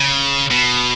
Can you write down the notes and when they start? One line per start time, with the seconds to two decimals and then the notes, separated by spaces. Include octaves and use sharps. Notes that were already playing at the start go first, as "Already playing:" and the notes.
Already playing: C#3
0.50 B2